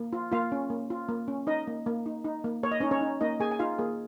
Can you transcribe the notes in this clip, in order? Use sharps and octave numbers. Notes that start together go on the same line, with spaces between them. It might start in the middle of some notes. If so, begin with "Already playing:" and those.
Already playing: A#3
F4
A#3 F4 F5
C#4
A#3
F4
A#3
C#4
D#4 D#5
A#3
A#3
D#4
D#4
A#3
A#3 C#5
D#5
C#4 D#4 C#5
C#4 C#5
D#4
A#3 D#4 D#5
A#3 G#4 G#5
G#5
D#4 F4 F5
A#3 G#4